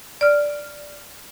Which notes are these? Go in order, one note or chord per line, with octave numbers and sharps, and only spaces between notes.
D5 F6